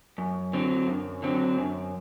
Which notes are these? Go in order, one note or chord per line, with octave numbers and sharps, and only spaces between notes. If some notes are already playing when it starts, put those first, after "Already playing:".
F#2
D3 F#3 C4
F#2
D3 F#3 C4
F#2